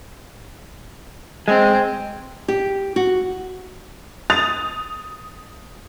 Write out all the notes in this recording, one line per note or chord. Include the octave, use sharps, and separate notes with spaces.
G#3 C4
G4
F#4
D#6 A6 F7